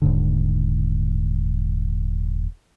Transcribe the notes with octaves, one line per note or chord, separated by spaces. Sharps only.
D#1 G#2 D3